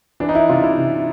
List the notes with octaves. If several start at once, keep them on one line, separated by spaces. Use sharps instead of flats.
E3 D4
D#4
E4
C3 F4
E4
C3